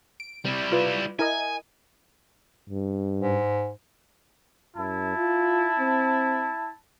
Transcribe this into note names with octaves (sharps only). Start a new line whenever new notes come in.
D7
C3 G3 E4
F4 B4 D5
E4 A#4 D#5 G#5
G2
G#2
F#2 E4 A5
F4
C4